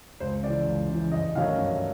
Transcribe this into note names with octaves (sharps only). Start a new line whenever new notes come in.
C#2 C5
C#3 E3 D5
C#2
C#3 E3
G2 D#5
D#3 F#3 A3 C#4 F5
G2